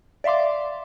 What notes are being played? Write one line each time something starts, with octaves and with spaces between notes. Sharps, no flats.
D5 E5 F5 C6 D6